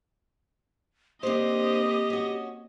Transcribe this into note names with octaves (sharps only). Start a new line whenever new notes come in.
A#3 C4 D4 G4 C5 D#5
C#4 F#4